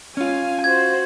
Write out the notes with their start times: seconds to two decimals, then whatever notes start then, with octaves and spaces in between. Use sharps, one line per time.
0.17 C#4 F4 F5 G#5
0.64 F#4 C5 G#6